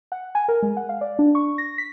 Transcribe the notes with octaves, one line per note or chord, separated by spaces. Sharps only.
F#5
G#5
A#4
G#3
F#5
F5
D5
D4
C#6
A#6
B6